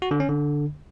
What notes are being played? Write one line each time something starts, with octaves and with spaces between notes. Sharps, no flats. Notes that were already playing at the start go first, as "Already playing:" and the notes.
F#4
D3
C#4
D3